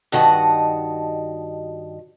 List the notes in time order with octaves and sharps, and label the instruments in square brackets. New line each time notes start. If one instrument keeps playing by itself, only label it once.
[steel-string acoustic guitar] G2 D#3 F#4 D#5 A5